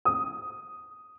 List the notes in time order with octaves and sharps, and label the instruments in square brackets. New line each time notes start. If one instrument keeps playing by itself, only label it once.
[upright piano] D#6